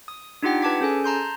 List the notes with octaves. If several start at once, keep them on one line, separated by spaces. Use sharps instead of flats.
D#6
D4 D#4 F4 G4 F#5 G5
B4 A5 D6 G#6 B6
C#4 G#4 A4 G#5
A5 A#5 C6 G6